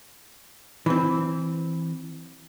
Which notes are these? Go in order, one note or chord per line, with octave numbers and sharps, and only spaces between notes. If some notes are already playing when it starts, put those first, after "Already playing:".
E3 C4